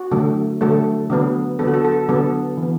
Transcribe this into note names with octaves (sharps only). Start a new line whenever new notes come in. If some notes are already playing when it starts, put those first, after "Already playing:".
Already playing: F#4
D3 F#3 A3
D3 F#3 A3 A4
D3 F#3 B3
D3 F#3 B3 A4
F#4
A4
A4
D3 F#3 B3 A4
E3
B3